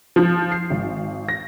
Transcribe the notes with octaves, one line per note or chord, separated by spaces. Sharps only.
F3
C7
G#1
A#6